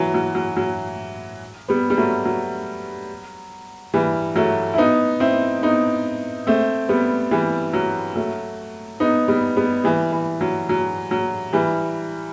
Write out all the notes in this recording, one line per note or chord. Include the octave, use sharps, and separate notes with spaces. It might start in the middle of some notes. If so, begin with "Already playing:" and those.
Already playing: E3 F#3
F#3
F#3
F#3
G3 B3
G3
F#3 A3
F#3
E3 G3
F#3 A3
E4
B3 D#4
C4 E4
B3 D#4
A3 C4
G3 B3
E3 G3
F#3
F#3 A3
B3 D#4
G3 B3
G3 B3
E3 G3
E3
F#3
F#3
F#3
E3 G3